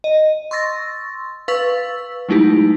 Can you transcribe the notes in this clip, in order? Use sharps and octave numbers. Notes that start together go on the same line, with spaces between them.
D#5
C6 C#6 E6 A6 A#6
B4 F5 C#6 E6 A6 B6
F#3 G#3 A3 D#4 E4 G4